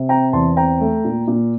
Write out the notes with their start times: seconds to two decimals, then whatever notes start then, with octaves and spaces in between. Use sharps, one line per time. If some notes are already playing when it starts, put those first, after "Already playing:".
Already playing: C3
0.09 C4 G5 A#5
0.33 E2 A5 C6
0.57 C4 G5 A#5
0.80 A3
1.04 A#2
1.28 A#2